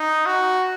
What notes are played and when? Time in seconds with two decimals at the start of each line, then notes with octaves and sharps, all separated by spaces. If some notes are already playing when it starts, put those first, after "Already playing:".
Already playing: D#4
0.26 F#4